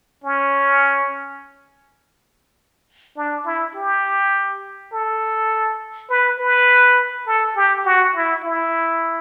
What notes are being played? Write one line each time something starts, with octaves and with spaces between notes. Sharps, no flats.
C#4
D4
E4
G4
A4
B4
B4
A4
G4
F#4
E4
E4